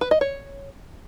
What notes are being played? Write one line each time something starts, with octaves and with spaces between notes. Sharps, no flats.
B4
D#5
C#5